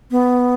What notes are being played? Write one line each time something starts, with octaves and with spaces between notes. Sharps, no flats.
B3